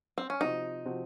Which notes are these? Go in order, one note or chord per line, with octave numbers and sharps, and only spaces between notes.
C4
C#4
C3 F3 C4 D#4 F#4
C3 F3 C4 F#4